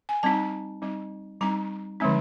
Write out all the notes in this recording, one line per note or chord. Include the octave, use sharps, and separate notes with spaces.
G#5
G3 C4 D#4 A5
G3 C4 D#4
G3 C4 D#4 A#5
D3 F3 G#3 C4 D#4